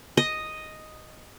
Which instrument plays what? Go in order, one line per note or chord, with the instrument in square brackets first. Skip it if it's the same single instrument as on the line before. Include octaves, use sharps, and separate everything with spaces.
[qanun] D#5